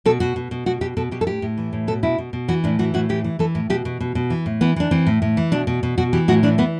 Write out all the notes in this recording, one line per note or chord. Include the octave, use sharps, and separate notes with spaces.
B2 A4
B2 F#4
B2
B2
B2 F#4
B2 G4
B2 A4
B2 G4
A4
A2 G4
A2
E3
A2
B2 A4
B2 E4
B2
B2
E3 F#4
A2 D4
E3 F#4
A2 F#4
E3 G4
E3
E3 A4
A2
B2 G4
B2
B2
B2
E3
A2
E3 B3
E3 D4
E3 C4
A2
A2
E3
B2 D4
B2
B2
B2 F#4
E3 G4
A2 F#4
E3 D4
E3 B3